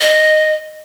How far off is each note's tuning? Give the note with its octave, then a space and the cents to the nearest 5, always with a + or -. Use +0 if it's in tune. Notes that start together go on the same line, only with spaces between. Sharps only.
D#5 -10